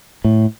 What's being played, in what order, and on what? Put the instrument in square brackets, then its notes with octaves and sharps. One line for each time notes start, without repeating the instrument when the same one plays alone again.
[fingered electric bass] A2